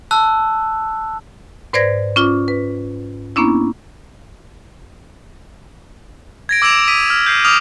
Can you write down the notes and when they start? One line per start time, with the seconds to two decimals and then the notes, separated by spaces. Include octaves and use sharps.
0.11 A5 E6 F#6
1.73 G#2 B4 C5 D5 G#6 A#6
2.16 C#4 F4 D6
2.48 B4
3.36 A#3 B3 C#4 D4 E4
6.49 G#6 A#6 D7
6.62 D6 E6 A#6 D7 E7 F7
6.87 D#6 B6 D#7
7.10 F6 B6
7.26 G6 C7
7.45 D6 D#6 F6 F7